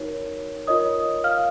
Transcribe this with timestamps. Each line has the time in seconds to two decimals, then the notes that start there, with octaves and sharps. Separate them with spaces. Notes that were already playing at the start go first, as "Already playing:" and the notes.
Already playing: D#4 F#4 A#4 C#5
0.67 F4 A#4 C#5 D#5 D#6
1.24 F5 F6